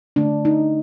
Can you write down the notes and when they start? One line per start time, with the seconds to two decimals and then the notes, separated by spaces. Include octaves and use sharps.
0.16 D3 A3 D4
0.45 D#4